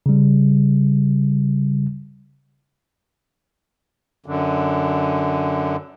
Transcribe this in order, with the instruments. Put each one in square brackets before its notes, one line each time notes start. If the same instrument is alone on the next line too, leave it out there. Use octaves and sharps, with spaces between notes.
[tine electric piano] C#3 G3
[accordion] F#2 D3